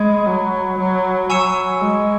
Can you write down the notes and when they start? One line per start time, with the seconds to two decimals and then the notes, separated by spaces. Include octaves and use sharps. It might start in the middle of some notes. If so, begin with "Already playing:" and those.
Already playing: G#3 B5 G#6
0.27 F#3
0.78 F#3
1.29 F#3 G#5 C#6 E6 C#7 E7
1.81 G#3